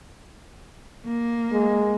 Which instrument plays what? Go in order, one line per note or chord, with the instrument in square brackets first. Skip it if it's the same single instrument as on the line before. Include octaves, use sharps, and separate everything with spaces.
[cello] A#3
[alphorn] G#3